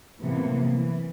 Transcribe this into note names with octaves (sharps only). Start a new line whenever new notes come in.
F#2 A2 C3 E3 A#3 B3
E3